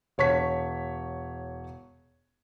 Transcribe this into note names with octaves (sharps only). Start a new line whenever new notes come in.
E1 C#5 C#6 B6